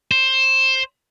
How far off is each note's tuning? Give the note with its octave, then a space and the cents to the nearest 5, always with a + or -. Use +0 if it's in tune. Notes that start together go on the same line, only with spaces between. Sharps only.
C5 +15